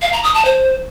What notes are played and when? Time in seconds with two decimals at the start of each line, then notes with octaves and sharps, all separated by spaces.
0.02 F5
0.13 A#5
0.23 D#6
0.34 A5
0.45 C5